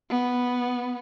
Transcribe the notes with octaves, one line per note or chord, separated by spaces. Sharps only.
B3